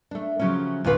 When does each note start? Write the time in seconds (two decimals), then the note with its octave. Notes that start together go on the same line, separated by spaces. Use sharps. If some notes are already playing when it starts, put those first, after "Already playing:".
0.11 A3 D4
0.39 C#3 F3 F#3 A3 C#4
0.84 D2 A#2 F4 B4